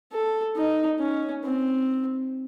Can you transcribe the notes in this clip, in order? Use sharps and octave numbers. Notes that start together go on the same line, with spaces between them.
A4
D#4
C#4
C4